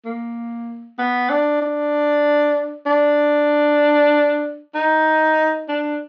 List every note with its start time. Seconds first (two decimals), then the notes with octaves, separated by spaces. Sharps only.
0.05 A#3
0.98 B3
1.30 D4
1.62 D4
2.86 D4
4.75 D#4
5.68 D4